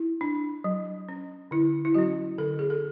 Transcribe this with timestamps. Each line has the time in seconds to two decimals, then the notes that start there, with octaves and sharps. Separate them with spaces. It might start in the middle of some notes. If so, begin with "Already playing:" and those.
Already playing: E4
0.21 D4
0.64 F#3
1.09 C#4
1.51 D3 E4
1.85 E4
1.94 F#3 C#4 F#4
2.38 D3 A4
2.59 G#4
2.70 A4